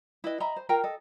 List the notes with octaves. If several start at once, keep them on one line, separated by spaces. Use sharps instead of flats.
E4 B4 D#5
D#5 E5 A#5 B5
C5
F4 A#4 G5 A#5
A4 D#5